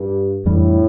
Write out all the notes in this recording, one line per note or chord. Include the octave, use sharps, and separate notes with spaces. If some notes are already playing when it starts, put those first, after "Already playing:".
Already playing: G2
F2 A2 E3 G3 D4